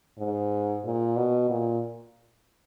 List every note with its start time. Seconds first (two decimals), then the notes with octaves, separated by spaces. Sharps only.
0.18 G#2
0.84 A#2
1.16 B2
1.49 A#2